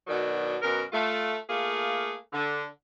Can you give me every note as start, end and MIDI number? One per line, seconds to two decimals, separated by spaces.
0.07 0.56 47
0.07 0.56 51
0.07 0.56 54
0.07 0.56 62
0.62 0.81 42
0.62 0.81 47
0.62 0.81 70
0.92 1.35 57
0.92 1.35 65
1.48 2.15 57
1.48 2.15 58
1.48 2.15 65
1.48 2.15 68
2.32 2.64 50